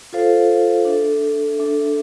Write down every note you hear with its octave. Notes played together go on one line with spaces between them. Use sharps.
F4 A4 C5 F5
D4 A4 E5
D4 A4 E5